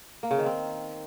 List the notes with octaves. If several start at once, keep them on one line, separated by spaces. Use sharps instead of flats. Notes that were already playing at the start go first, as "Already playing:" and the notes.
A#3
C#3
D#3
C4